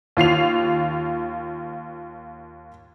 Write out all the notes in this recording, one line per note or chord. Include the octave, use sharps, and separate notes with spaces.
D#2 F4 C7 F7